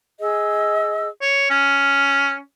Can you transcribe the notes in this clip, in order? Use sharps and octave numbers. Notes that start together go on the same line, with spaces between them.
G#4 D#5 E6
C#5
C#4 F6